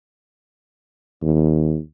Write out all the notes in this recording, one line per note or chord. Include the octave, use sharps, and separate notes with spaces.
D#2